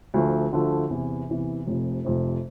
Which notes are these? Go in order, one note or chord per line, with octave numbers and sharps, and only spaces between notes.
D2 D3 F3 A3
D2 D3 F3 A3
E2 C3 E3
E2 C3 E3
F1 F2 C3
F1 F2 C3